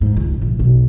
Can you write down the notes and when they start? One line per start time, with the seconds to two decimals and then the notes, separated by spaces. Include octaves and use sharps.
0.01 G#2
0.17 C#2
0.41 A#1
0.59 B1